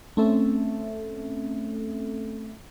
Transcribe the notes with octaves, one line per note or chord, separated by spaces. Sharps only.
A3 C4 C#4 A4 E5